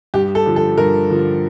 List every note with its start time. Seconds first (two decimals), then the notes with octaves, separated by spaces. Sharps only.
0.14 G2 G4
0.35 A4
0.46 D3 F3
0.56 A4
0.78 G2 A#4
1.10 D3 F3